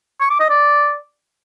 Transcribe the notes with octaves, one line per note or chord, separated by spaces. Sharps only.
C#6
D6
D#5
D5